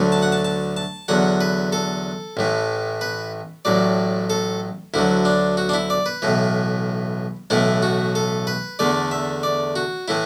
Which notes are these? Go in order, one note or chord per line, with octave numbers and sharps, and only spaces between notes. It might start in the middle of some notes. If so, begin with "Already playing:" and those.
Already playing: D2 D3 F#3 A3
A5
F#5
A5
A5
A5
E2 D3 F#3 F#5
B4
A4
A1 A2 E3
B4
A1 A2 F#3 D5
A4
D2 D3 F#3 E4
D4
F#4
D4
E4
D5
B4
B1 A2 E3
B1 A2 E3 A3 E4
F#4
A4
B4
E2 D3 A3 D5
E5
D5
F#4
A2 E3 E4